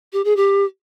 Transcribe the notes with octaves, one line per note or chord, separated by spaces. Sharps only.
G4
G#4
G4